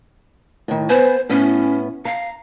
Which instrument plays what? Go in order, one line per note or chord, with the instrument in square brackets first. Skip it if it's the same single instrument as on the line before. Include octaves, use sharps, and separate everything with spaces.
[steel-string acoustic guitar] A2 D#3
[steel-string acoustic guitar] B3 B4 G#5 [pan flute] C5
[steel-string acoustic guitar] A2 B3 [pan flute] C#4
[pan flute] F5 [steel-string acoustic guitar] A#5